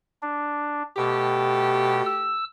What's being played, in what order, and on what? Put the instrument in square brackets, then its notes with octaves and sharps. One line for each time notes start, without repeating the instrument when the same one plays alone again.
[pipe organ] D4
[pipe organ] B2 [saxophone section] A3 G4
[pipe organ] E6